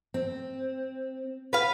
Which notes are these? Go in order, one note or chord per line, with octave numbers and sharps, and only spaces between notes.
C4
B4 F5